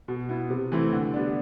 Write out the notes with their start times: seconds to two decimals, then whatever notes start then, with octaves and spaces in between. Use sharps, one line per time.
0.08 B2
0.29 B3 E4
0.50 C3
0.72 E3 A3 C4 E4
0.93 D3
1.14 G3 B3 D4